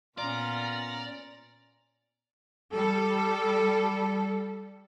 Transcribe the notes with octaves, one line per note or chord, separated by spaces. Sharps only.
A#2 B3 C#4 F4 D5 A#5
G3 A4